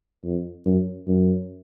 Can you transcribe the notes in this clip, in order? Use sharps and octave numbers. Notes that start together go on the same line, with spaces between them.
F2
F#2
F#2